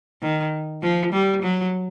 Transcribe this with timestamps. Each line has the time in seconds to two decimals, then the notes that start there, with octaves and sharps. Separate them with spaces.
0.22 D#3
0.83 F3
1.13 G3
1.43 F#3